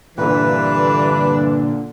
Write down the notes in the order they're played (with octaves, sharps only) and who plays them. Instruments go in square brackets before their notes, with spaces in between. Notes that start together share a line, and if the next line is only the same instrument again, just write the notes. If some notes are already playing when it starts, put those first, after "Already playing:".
[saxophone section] G2 E3 [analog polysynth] A#2 D3 [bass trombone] D4 [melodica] B4